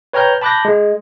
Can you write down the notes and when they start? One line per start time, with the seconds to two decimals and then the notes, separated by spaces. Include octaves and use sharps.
0.13 B4 C#5 G5 A#5 F6 G6
0.41 A5 B5 D6 F#6 G6 A#6
0.65 G#3